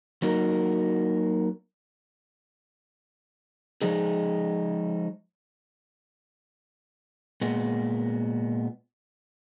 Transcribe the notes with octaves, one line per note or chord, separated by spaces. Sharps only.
F#3 A#3 D#4 F#4 A#4
F3 G#3 D#4 G#4
A#2 G#3 B3